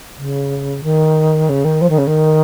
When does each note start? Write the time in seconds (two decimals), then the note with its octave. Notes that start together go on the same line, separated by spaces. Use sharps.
0.19 C#3
0.83 D#3
1.49 C#3
1.64 D#3
1.81 F3
1.89 D#3
1.98 C#3
2.07 D#3